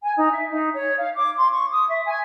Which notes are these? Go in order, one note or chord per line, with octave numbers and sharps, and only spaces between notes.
G#5
D#4
E5
D#4
C#5
F5
D6
C6
C#6
D#6
E5
G#5